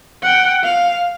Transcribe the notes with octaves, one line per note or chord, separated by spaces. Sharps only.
F#5 G5
F5